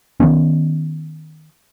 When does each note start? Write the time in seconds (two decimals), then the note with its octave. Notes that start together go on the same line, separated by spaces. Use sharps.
0.20 D#3 F#3 B3 C#4